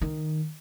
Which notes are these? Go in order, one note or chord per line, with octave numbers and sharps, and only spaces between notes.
D#3